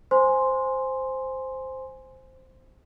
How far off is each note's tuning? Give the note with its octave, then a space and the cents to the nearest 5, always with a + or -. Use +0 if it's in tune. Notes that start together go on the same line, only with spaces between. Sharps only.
C5 +0 G#5 +0 C6 +0